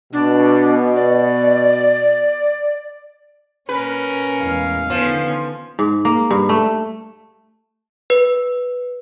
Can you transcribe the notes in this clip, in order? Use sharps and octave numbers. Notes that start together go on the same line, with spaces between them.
B2 D4
D5
A#2 C#4 A#4 B4
E2 A2 G#3 F5
D3 D#3 F3 B3 C#4
G#2
A#3
G2
A3
B4